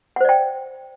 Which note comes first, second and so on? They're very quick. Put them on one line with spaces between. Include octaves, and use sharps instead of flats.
F#5 C5 D5 G5